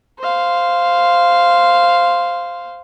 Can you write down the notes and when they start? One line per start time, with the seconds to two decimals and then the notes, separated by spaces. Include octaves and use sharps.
0.19 C5 F5